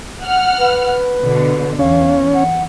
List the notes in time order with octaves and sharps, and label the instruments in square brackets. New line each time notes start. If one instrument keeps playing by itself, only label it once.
[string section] F#5 F6
[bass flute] B4
[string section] B2 D3
[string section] E2 [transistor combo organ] C#4 [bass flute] F5
[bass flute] F#5